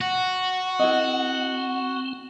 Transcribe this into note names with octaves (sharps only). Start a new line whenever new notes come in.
F#4 F#5
C4 E4 A4 D#5